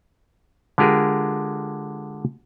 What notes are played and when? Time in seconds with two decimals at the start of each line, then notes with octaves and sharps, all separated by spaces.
0.78 D3 G#3 F4 G4 G#4 A#4